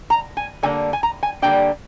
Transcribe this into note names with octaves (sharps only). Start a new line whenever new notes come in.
A#5
G#5
D3 G3 A#3 D4 G#5
G#5
A#5
G#5
D3 G3 A#3 D4 G5